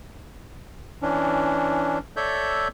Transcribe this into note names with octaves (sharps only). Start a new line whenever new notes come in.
E3 C#4 D4
A4 C#5 D5 E5 G6